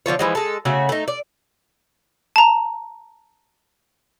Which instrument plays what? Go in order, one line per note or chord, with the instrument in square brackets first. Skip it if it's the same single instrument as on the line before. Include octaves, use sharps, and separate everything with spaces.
[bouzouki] D3 F3 F4 C#5
E3 F3 G#3
G#3 A4
C#3 A3 F#4
A3 D#4
D5
[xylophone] A5 A#5